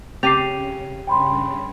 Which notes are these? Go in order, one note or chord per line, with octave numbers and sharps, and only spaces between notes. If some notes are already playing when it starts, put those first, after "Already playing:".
C#3 C4 G4 D6 C7 D#7 F7
G2 C#3 G5 B5 C6